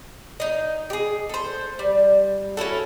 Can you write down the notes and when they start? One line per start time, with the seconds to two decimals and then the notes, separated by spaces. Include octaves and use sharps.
0.40 D#4 D#5
0.90 G4 G#4
1.29 A4 C5
1.79 G3
2.57 C#4 E4 F#4 A4